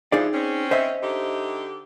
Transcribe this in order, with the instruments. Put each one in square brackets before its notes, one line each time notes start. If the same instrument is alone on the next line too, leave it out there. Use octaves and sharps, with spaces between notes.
[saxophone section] E3 F3 [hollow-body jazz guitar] D#4 G#4 D5
[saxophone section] C4 C#4
[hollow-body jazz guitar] C5 D#5 E5
[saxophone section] D3 D#4 G4